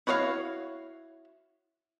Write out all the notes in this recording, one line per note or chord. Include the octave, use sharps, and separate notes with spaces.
E4 F#4 C#5 D#5 F5